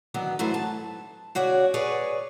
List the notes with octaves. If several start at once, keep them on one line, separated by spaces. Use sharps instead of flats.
D3 D#3 F#3 B3
G#2 E3 F#3 A3 B4 C5
A5
C#3 F#4 C#5 D5
G#4 B4 C#5 D5 G#5